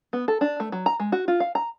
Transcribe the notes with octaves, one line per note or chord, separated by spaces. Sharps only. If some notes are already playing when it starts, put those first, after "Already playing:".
B3
A4
D4
A3
F#3
A#5
G#3
F#4
F4
F5
A#5